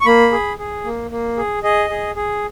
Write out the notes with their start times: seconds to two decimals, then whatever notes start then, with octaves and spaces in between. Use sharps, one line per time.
0.01 C#6
0.06 A#3 B5
0.32 G#4
0.59 G#4
0.84 A#3
1.11 A#3
1.37 G#4
1.63 G#4 D#5
1.90 G#4
2.16 G#4